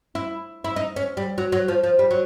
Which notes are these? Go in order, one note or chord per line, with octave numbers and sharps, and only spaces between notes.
E4
E4
D#4
C#4
G3
F#3
F#3
F3
F3
G3
F#3